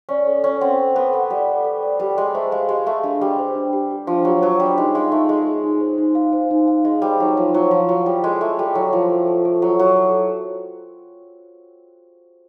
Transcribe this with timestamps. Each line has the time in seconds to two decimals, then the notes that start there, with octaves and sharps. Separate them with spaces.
0.09 C#4 D5
0.27 A4
0.44 C#4 A4
0.61 C4 F#5
0.78 F#5
0.96 B3 A4
1.13 F#5
1.30 G3 D5
1.48 A4
1.64 A4
1.82 D5
1.99 G3 G4
2.17 G#3 G4
2.34 A3 C5
2.51 G#3 F5
2.69 G#3 G4
2.86 A3 F5
3.03 G#3 D4
3.21 G3 G4
3.39 C5
3.55 D4
3.73 G4
3.91 G4
4.07 F3 D4
4.25 F#3 G4
4.42 F#3 C5
4.60 G3 D4
4.77 G#3 D#4
4.95 G#3 F5
5.11 A3 D#4
5.29 G#3 G#4
5.47 G#4
5.64 D#4
5.80 C5
5.98 D#4
6.15 F5
6.33 C5
6.51 D#4
6.68 F5
6.85 G#3 G#4
7.02 G3 C5
7.20 F#3 D#4
7.37 F3 C5
7.54 F#3 E4
7.71 F3 E4
7.88 F#3 E4
8.06 G3 E4
8.23 G#3 A4
8.41 A3 E4
8.58 G3 A4
8.75 F#3 E4
8.93 F3 E4
9.10 A4
9.28 A4
9.45 A4
9.62 F#3 E4
9.79 F#3 E4
9.96 A4